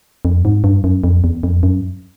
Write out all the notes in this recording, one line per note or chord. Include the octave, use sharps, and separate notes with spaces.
F2
G#2
G2
F#2
F2
E2
F2
F#2